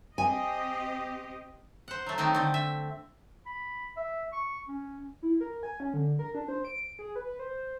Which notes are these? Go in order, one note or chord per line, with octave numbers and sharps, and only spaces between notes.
C4 G4 D#5 G#5
C5 F#5
F#3 A3
D#3 F#3 A3 B3 C4 D#4
D3 C4
E5
B5
E5
C#6
C#4
E4
A#4
G#5
C#4
D3
A#4
D4
C5
D7
G#4
B4
C5